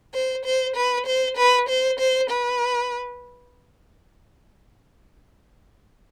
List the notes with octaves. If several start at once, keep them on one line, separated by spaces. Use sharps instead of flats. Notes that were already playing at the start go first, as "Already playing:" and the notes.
C5
C5
B4
C5
B4
C5
C5
B4